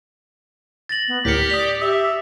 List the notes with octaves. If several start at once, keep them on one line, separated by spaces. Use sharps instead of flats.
A6 A#6 F#7
B3
D2 A2 G4 A#4 B6 C#7
D5 D#6 F7
G4 E5